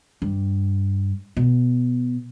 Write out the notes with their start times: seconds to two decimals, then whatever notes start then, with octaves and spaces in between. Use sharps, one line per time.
0.22 G2
1.37 B2